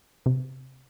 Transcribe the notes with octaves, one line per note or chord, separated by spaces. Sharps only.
C3